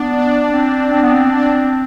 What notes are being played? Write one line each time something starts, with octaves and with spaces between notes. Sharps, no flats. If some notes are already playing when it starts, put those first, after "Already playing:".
Already playing: B3 D4
D4
C4
C4
B3
C4
D4